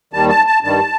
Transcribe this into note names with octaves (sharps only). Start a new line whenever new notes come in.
D#2 D#3 G3 A5
A5
A5
G2 D#3 G3 A5